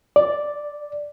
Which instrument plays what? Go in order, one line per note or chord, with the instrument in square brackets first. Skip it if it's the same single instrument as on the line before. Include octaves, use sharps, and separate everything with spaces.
[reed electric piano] D5